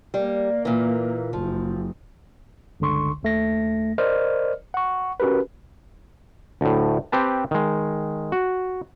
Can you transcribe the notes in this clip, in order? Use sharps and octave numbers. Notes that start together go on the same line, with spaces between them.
G3 A#3
A#2 E3
F#1 F3
G1 C#2 D3 C6 C#6
D#2 A3 A#6
A#4 C5 D5 D#5 F6
F#5 C#6
C#4 F#4 G4 A#4 B4
D2 A2
C4 G4 B4 A5
D#3 G#3
F#4